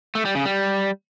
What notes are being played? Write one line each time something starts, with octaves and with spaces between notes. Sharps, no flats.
A3
G3
C#3
G3